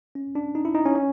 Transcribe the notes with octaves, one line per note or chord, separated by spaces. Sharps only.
C#4
D4
D#4
E4
D#4
C#4
C#4